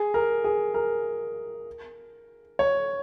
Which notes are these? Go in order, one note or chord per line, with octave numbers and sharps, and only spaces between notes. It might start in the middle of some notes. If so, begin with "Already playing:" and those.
Already playing: G#4
A#4
G#4
A#4
C#5